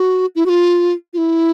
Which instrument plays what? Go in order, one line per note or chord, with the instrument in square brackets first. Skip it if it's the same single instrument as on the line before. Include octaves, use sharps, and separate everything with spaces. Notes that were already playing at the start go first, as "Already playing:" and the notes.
Already playing: [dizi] F#4
E4
F#4
F4
F4
E4